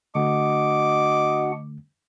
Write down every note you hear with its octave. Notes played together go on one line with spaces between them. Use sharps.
D3 A3 D4 F#4 D#5 F#5 D6